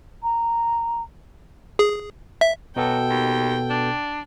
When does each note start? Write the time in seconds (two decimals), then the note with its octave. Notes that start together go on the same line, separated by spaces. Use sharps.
0.23 A#5
1.79 G#4
2.41 E5
2.76 B2 F#3 B3 A4 G5
3.10 D#2
3.70 D4